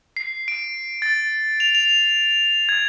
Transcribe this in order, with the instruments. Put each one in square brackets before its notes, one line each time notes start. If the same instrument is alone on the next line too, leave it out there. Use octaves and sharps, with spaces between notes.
[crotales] C7
D7
A6
F7
F7
G#6